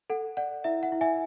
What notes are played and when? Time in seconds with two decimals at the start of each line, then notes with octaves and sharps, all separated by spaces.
0.10 A4 F#5
0.37 D5 F#5
0.64 E4 E5
0.83 F#5
0.92 E4
1.01 E5 G#5